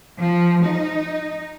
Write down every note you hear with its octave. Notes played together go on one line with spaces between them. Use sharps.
F3
D#4